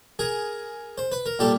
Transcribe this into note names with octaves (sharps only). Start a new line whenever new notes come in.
G#4 A#4
C5
B4
A#4
A#2 G3 G4 A4